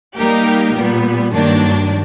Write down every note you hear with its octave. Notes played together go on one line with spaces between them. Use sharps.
G3 A#3 D#4 G4 A#4
A#2 G3 B3
G2 D#3 F#3 A#3 D4